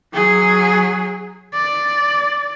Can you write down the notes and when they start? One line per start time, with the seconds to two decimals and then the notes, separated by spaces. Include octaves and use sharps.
0.14 F#3 G#4
1.54 D5